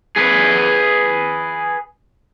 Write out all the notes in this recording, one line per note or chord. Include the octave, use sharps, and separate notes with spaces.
G#4 B4